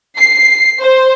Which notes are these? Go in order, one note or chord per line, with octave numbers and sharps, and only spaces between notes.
C7
C5